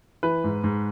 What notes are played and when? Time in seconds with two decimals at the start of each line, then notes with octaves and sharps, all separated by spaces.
0.23 E3 B4
0.44 G#2
0.64 G#2